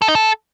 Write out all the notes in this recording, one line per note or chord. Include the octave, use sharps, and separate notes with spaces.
A4
D#4
A4